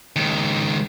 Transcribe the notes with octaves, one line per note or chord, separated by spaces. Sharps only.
C#2 D#3